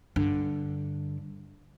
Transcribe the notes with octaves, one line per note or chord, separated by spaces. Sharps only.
G2 D3